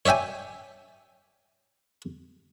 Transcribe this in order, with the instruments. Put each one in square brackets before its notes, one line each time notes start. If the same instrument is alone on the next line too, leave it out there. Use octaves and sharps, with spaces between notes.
[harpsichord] C#5 D5 E5 G5 G#5